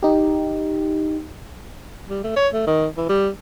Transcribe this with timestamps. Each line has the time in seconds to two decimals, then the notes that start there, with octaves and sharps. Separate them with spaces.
0.03 D#4 G4
2.10 G3
2.24 A3
2.36 C#5
2.53 A3
2.67 D#3
2.98 E3
3.09 G3